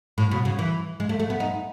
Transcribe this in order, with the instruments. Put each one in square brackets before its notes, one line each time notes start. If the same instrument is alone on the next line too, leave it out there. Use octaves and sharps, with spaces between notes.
[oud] A2
B2
C#3
E3
G#3
A3
A3
B3
D#4